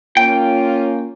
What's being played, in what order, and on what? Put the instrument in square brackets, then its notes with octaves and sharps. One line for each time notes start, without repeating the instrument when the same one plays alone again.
[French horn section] A#3 C#4 F4 [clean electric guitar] G5